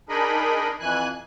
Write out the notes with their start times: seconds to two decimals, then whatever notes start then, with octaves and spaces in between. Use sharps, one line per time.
0.09 D4 D#4 G#4 A#4 D#5 B5
0.80 F2 E3 G#5 F#6